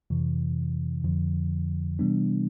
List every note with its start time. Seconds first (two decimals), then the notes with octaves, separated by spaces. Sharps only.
0.10 F2 C3 E3
1.04 F2 D3 F3
1.99 C3 E3 G3 B3 D4